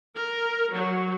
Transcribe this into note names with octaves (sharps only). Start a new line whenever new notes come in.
A#4
F#3